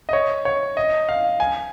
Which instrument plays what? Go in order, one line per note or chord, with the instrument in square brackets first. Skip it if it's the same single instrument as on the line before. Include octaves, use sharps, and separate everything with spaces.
[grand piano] D#5
C#5
C#5
D#5
F5
G#5